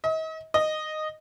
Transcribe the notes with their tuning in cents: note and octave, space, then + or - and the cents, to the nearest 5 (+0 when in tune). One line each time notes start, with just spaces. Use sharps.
D#5 +40
D#5 -10